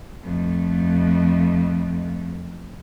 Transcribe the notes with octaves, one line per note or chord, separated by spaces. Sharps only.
F2 A3